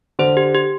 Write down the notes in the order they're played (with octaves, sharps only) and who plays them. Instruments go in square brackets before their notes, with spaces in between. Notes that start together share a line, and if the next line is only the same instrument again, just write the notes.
[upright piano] D3 [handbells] C5
[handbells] G4
G4